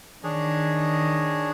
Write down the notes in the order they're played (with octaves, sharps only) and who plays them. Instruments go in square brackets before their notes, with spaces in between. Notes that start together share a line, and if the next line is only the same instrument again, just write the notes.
[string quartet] D#3 [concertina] D4 G#4 C#5